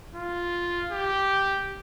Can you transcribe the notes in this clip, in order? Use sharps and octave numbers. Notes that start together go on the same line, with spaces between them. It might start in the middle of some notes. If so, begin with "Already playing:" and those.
F4
G4